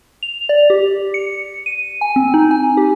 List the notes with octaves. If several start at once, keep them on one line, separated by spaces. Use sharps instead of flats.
F7
D5
G4
C#7
D#7
G#5
C4
D#4
G#5
G4